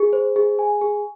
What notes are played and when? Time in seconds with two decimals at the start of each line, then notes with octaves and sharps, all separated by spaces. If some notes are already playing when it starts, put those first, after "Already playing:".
Already playing: G#4
0.13 C5
0.36 G#4
0.59 G#5
0.81 G#4